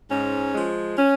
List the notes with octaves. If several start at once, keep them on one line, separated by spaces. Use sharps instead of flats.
G#2 C#4
F3 G#3
C#4